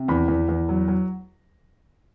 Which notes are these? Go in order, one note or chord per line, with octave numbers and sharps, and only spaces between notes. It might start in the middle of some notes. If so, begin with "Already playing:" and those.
Already playing: C3
E2 B5
E2
E2
F#3
F#3